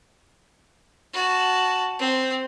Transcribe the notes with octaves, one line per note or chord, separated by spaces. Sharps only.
F#4 A5
C4